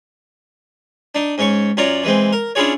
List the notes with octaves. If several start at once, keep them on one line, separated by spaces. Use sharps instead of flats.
D4 D#4
G#2 C#4 C#5 C#6
F#2 F4 C#5 D5 A#5
E3 G#3 C4
A#4
C#4 D4 E4 F4 G#4 C#5